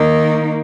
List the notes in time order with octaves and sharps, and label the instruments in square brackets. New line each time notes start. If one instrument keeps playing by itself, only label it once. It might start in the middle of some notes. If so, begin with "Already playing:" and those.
Already playing: [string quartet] D#3 A#3 D#4